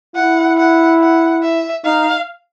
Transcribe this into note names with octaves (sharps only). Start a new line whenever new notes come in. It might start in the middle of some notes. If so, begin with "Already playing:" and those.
E4 F#5
F#5
F#5
E5
D#4 F5